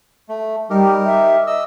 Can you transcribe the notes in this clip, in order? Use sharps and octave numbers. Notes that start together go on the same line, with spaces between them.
A3
G3 D#4 G4 A#4
E5
D#5 E6